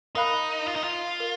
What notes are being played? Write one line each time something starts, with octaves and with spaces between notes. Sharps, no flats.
D#4 A#4 F5 B5 F#6
F4
D#4
F4
A#4